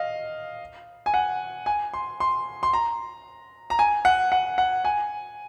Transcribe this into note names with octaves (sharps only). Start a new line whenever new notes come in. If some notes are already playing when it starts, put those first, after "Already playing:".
Already playing: D#5 F5
G#5
F#5
G#5
C6
C6
C6
A#5
A#5
G#5
F#5
F#5
F#5
G#5